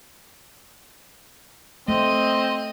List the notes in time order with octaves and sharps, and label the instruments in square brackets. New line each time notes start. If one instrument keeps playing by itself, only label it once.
[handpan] A3 [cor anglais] C4 [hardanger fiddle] D#5